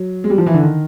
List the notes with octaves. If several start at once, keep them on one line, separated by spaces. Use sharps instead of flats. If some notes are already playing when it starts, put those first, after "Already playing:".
Already playing: F#3
G#3
G3
F3
E3
D3
D#3